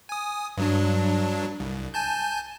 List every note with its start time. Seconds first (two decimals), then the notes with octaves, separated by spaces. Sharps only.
0.09 G#5 D#6
0.57 G2 F#3 D4
1.60 C2
1.94 G#5 A5 G6